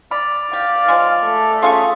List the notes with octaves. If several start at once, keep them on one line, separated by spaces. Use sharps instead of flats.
D5 B5 F6
G4 F5
F3 G#3
A3
C#4 F4 G#4 A4 F5 C#6